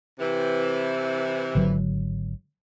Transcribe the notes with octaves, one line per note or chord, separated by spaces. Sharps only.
C3 E3
G#1 D3 F#3